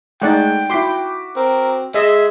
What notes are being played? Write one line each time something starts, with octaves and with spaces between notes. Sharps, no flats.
G#3 A3 D#4 D5 F#5 G5
E4 F#4 C6 D6 B6
C4 A#4
G#3 G#4 D#5 E5 E6